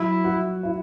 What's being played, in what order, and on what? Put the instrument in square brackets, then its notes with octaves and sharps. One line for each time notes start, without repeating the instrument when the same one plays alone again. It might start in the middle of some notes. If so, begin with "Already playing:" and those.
Already playing: [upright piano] F#3 [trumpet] E4
[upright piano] F#4
E4